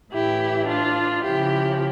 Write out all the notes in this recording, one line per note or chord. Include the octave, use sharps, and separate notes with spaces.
A2 E3 E4 G4
D4 F4
C#3 F3 E4 G4